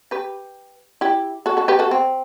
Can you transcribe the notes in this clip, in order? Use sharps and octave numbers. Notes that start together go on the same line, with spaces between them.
G4 B4
E4 G4
F#4 A4
F#4 A4
G4 B4
F#4 A4
C4